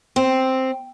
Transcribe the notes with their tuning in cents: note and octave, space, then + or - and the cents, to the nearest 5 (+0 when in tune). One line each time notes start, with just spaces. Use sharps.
C4 +0